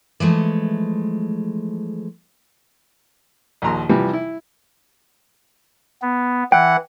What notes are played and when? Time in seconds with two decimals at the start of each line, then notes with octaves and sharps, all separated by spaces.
0.20 E3 F3 G#3 A3
3.62 A#1 D#2 A#5 C6
3.89 C3 E3 F3 G3
4.13 E4
6.02 B3
6.52 E3 F#5 G5